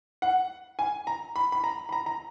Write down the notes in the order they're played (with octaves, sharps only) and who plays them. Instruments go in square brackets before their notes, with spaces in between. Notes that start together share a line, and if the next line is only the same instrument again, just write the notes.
[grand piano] F#5
G#5
A#5
B5
B5
A#5
B5
A#5
A#5